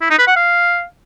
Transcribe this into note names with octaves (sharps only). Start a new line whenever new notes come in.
E4
D#4
B4
F#5
F5